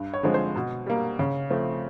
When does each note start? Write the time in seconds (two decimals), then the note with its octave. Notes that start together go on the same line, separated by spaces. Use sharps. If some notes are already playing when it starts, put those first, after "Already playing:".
Already playing: G2
0.13 C#5
0.23 D3 F3 G#3 C4
0.34 C5
0.55 B2
0.86 G3 A#3
1.19 C#3
1.50 F3 A3 C4